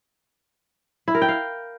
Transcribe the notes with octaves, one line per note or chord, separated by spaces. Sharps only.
E4
A#4
G5
F5